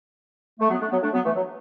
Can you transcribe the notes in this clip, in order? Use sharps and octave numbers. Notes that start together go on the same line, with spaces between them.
A3
F#3 B3
A3 D4
F#3 B3
A3 D4
F#3 B3
E3 A3
F#3